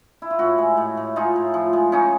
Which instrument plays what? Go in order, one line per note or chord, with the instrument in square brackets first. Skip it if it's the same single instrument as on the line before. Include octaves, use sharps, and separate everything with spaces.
[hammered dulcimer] E4
F4
A2 E4 F#4
G#3
A2
A2
G#3 D#4 F4
A2
F3
G#3
C#3 C#4 D#4